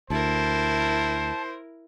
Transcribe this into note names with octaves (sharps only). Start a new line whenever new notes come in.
D2 E4 A#4 C5 A5